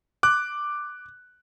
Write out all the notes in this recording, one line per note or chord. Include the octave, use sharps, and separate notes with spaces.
D6 F#6